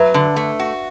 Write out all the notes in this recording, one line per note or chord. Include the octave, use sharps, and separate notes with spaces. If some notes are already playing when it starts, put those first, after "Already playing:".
Already playing: F#3 B4 E5
D3
A3
F#4